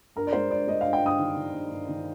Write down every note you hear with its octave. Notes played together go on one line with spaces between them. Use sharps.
G2 A#4
D5
G#3 C5
G2 D5
G#3 D#5
G2 F5
G5
G2 D#6
D#3
D#3
G2
G2
D#3